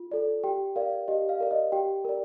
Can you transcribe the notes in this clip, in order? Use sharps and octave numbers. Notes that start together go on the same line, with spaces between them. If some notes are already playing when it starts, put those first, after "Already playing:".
Already playing: F4
A4 D5
G4 G5
A#4 D5 F5
G4 D#5
F5
A#4 D5
D#5
G4 G5
A#4 D5